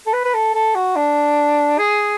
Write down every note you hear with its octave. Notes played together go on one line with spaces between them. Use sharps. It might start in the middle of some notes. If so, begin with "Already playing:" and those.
A4
B4
B4
A4
A4
F#4
D4
G#4